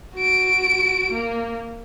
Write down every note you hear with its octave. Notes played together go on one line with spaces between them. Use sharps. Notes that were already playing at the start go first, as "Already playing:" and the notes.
F#4 D7
A#3